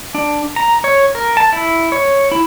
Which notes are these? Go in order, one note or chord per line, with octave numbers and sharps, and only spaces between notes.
D4
A#5
C#5
A#4
A5
E4
C#5
E4